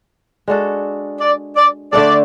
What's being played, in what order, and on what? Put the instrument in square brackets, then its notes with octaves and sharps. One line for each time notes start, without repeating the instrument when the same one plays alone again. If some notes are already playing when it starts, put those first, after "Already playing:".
[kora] G#3 D4 F#4 A4
[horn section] D5
D5
[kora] D3 A3 D4 A4 [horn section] D5